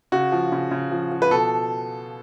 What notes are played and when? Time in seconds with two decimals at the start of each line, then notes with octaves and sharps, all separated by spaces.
0.12 C#3 F#4
0.32 F3
0.52 C#3
0.71 C#3
0.91 F3
1.11 F3
1.22 B4
1.31 B2 A4